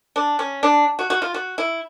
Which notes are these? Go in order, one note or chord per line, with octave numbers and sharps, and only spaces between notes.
D4
C#4
D4
F#4
F#4
F4
F#4
E4